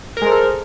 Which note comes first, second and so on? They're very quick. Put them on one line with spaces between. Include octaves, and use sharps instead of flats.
A#4 G#3 C5 A4